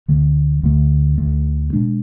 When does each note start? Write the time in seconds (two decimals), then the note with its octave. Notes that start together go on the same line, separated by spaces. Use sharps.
0.08 D2 D3 A3
0.63 D2 D3 A3
1.18 D2 D3 A3
1.73 B2 G#3 D4